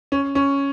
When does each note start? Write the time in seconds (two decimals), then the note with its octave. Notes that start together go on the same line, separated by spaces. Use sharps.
0.12 C#4
0.35 C#4